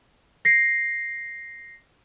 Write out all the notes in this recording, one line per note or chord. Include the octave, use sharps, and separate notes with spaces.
A#6 C7